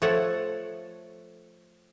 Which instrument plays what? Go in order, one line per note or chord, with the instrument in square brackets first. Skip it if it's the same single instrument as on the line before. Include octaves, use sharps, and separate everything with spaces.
[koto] F3 A3 A4 C#5 F#5